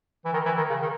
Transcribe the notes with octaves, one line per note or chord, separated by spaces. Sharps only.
E3
D#3
E3
D#3
C#3
D#3